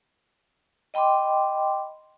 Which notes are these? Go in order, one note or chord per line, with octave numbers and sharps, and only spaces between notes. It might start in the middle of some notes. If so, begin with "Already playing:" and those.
D#5 G5 B5 C6 D6